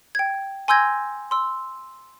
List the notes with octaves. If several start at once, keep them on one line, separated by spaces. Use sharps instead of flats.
G5 G#6
G#5 C6 E6 G6 G#6 A#6
C6 E6